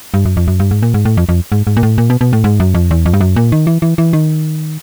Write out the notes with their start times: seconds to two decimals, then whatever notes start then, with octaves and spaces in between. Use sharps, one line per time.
0.14 G2
0.25 F#2
0.37 F2
0.48 F#2
0.60 G2
0.71 G#2
0.83 A#2
0.94 G#2
1.05 A2
1.17 F2
1.29 F2
1.52 G#2
1.67 G#2
1.77 A#2
1.83 A2
1.98 A#2
2.10 B2
2.21 B2
2.33 A2
2.44 G#2
2.60 F#2
2.74 F2
2.91 E2
3.06 F2
3.14 G2
3.21 F#2
3.36 A#2
3.52 D#3
3.67 E3
3.82 E3
3.98 E3
4.13 D#3